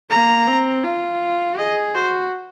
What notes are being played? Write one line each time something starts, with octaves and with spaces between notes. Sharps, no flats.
A#3 A#5
C4
F4
G#4 D#5
F#4 C5